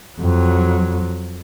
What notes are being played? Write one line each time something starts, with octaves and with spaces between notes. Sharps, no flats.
F2 F#3